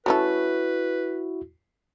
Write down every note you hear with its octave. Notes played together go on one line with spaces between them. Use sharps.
A3 C#4 E4 F#4 A4 B4